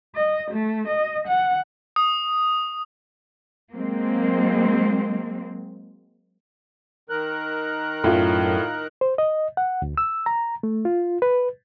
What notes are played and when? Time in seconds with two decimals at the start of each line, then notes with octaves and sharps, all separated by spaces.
0.15 D#5
0.51 A3
0.88 D#5
1.27 F#5
1.96 D#6
3.74 F#3 G#3 A#3 C4
7.10 D#3 A#4 F#6
8.04 F#2 A2 E4 F4
9.01 C5
9.18 D#5
9.57 F#5
9.82 D2
9.97 E6
10.26 A#5
10.63 A3
10.85 F4
11.22 B4